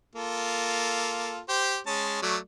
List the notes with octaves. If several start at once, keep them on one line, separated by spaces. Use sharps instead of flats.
A#3 F4 A4
G4 C5
G#3 C#4 A5
F#3 A3 D5